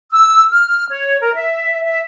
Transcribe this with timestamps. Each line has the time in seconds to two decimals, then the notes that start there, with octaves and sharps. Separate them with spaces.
0.12 E6
0.52 F6
0.90 C#5
1.20 A#4
1.35 E5
1.85 E5